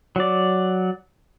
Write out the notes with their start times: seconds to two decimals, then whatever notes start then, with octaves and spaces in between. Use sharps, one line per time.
0.16 F#3 D5